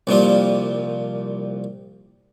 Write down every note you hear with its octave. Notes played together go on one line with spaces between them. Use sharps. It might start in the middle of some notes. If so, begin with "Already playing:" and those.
C2 A#2 F3 G3